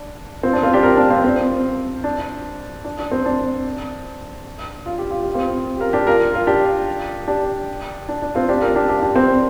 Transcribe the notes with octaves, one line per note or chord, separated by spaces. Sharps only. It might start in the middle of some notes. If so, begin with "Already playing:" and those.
Already playing: D4
C4 F4
D4
C4 F4
D4 G4
F4 A#4
D4 G4
C4 F4
C4
D4
D4
D4
C4
D4
F4
G4
F4
G4
C4 F4
G4
F4 A#4
D4 G4
F4 A#4
F4 A#4
D4 G4
D4 G4
D4
D4
C4 F4
D4 G4
F4 A#4
D4 G4
D4 G4
D4 G4
C4